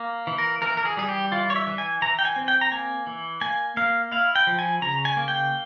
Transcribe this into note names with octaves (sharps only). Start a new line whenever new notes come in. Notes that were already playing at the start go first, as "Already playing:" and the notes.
Already playing: A#3
E3
A#4
E3 A#4
A#4
G#4
G3 G#4
G4
E3 F4
C#5
E5
E3
G#5
E3 A#5
G5
G#5
C4
G5
A#5
A#3 G#5
E3
A#3 G#5
A#3 F5
E4 F5
G5
F3
G#5
C#3 A#5
G#5
A#3
G5